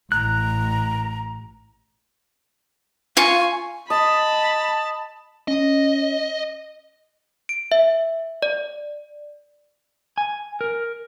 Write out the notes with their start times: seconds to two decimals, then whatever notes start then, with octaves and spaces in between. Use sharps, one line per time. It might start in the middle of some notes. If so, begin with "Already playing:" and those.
0.12 A1 A#5 F#6
3.17 F4 G#5 C#6
3.90 D#5 A5 B5
5.48 C#4 D#5
7.49 D7
7.72 E5
8.42 D5
10.18 G#5
10.61 A#4